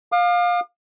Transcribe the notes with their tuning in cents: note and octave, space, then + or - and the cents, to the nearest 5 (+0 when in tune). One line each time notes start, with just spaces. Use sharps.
F5 +20 D6 +45